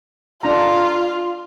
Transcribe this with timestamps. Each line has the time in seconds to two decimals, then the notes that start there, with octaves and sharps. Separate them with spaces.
0.43 D4 F4 A#5